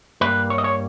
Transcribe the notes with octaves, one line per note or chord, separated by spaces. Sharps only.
G2 G3 A#3 B4
C#5
D#5
C#5